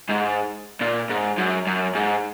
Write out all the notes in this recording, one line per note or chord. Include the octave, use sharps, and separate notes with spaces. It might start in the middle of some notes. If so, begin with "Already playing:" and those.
G#2
A#2
G#2
F#2
F#2
G#2